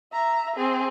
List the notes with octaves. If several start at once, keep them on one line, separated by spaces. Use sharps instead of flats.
E5 A#5
C4 G#4